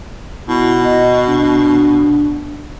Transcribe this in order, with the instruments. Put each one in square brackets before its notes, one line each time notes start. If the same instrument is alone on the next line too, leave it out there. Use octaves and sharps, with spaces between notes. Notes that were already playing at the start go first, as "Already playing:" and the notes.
[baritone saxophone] B2 [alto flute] E4
[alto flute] D#5
D4